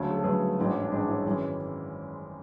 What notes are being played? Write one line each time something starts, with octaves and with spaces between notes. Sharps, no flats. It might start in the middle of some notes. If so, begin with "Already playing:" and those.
Already playing: D2 C#3 F#3 A3 A4 C#5
G#4
A4
D2 C#3 F#3 A3 G#4 B4
A1 G#2 E3 G#3 D4 F#4
C#4 E4
D4
A1 G#2 E3 G#3 D4
C#4 E4
G#1 F#2 E3 G#3